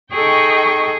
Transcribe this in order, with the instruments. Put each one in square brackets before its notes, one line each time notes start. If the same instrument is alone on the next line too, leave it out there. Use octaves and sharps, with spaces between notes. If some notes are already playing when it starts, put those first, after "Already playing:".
[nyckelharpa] D#4 A4 [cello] G#4 [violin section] D#5 G5 C#6